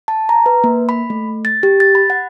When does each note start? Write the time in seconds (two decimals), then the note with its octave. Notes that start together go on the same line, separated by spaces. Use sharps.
0.08 A5
0.29 A#5
0.46 B4
0.64 A#3
0.89 B5
1.10 A3
1.45 A6
1.63 G4
1.80 A6
1.95 B5
2.10 F#5